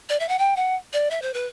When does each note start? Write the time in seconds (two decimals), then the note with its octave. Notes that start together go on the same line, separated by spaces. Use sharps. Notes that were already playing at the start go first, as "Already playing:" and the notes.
0.09 D5
0.20 E5
0.29 F#5
0.39 G5
0.56 F#5
0.93 D5
1.10 E5
1.22 C5
1.34 B4